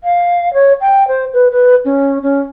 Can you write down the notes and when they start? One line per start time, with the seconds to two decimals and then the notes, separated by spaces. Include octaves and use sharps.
0.03 F5
0.53 C#5
0.80 G5
1.07 C5
1.33 B4
1.51 B4
1.84 C#4
2.22 C#4